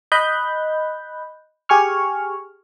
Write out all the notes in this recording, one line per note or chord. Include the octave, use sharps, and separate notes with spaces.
D#5 B5 F#6 G6
G4 G#4 G#5 C#6 F6